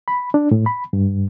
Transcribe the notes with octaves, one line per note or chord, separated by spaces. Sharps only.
B5
D4
A2
B5
G2